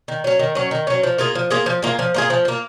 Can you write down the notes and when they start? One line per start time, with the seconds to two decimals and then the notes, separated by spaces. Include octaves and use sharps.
0.08 D#3
0.24 F#3 C#4
0.39 D#3
0.55 F#3 C#4
0.71 D#3
0.87 F#3 C#4
1.03 F3
1.18 A#3 F4 G#4
1.35 F3
1.50 A#3 F4 G#4
1.66 F3
1.82 A#3 F4 G#4
1.99 F3
2.14 A#3 F4 G#4
2.30 F3
2.45 A#3 F4